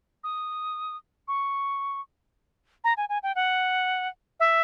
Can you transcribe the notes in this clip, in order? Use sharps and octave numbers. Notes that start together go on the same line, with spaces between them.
D#6
C#6
A#5
G#5
G#5
G5
F#5
E5